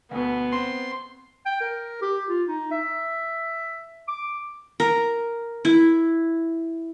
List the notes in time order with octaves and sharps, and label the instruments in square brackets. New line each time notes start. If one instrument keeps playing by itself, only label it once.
[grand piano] D2 B2 [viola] B3
[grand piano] C4 [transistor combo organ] C6
[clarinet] G5
A#4
G4
F4
D#4
E5
D6
[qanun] A#4
E4